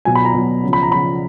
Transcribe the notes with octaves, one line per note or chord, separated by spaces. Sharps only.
B2 F#3 G#5
B5
A#5
B2 F#3
C#3 F3
B5
A#5
C#3 F3 B5